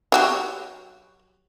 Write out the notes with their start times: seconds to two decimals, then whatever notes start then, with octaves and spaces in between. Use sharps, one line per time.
0.12 F#3 F#4 G4